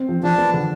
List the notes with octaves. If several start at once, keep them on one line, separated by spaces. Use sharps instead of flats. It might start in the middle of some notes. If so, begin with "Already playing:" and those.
Already playing: C4
F3
F3 D4
B3
D3